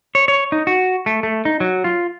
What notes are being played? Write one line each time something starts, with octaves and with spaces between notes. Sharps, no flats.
C#5
C#5
D#4
F#4
A3
A3
D#4
F#3
F4